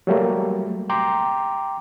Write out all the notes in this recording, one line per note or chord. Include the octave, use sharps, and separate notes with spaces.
F#3 G3 A3 A#3
G5 A#5 C6 D6